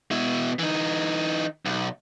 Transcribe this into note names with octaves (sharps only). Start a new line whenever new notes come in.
B2 E4
E3 D#4
B1